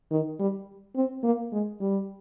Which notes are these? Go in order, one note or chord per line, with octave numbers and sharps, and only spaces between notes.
D#3
G3
C4
A#3
G#3
G3